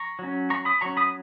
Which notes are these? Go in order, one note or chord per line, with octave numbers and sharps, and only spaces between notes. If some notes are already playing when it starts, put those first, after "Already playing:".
Already playing: A#5 C#6
F#3 C#4
A#5 C#6
B5 D#6
F#3 C#4 A#5 C#6
B5 D#6